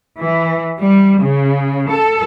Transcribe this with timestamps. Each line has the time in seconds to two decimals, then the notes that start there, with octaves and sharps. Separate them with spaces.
0.20 E3
0.78 G3
1.20 C#3
1.89 A4